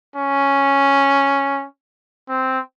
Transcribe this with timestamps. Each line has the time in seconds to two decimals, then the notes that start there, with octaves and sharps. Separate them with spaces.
0.16 C#4
2.29 C4